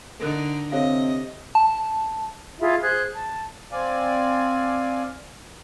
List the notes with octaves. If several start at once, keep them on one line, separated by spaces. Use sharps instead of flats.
D3 D#4 A4 A#4 F#6
C3 A4 C#5 D#5 F5
A5
E4 F4 G#4 E5
G#4 C5 F#6 G6
A5
C4 D5 F5 G#5